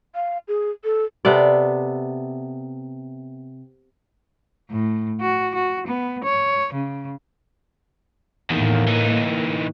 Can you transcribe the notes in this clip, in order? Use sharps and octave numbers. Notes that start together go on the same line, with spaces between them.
F5
G#4
A4
C3 B3 A4 D5
A2
F#4
F#4
B3
C#5
C#3
E2 A2 D#3 A#3
E3 D#4